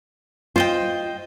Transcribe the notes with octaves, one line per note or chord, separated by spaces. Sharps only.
F4 C5 D#5 G5